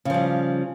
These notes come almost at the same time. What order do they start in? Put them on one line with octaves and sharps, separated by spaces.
C#3 F3 G3